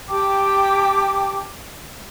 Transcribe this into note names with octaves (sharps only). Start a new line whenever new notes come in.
G4 G5 A5 D6